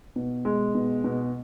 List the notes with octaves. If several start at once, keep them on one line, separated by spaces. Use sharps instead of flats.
B2
G#3
B2
B2